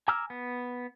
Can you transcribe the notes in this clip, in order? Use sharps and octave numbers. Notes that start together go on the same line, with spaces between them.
G#5 A#5 D6 E6 F6
B3